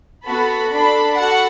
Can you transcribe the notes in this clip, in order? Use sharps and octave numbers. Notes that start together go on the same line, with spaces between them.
B3 F#4 A4 B5
D4 A4 B5
F#4 A4 F#5